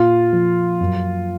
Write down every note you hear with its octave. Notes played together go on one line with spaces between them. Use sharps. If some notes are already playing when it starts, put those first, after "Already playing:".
Already playing: A#2 F4
F3
F#2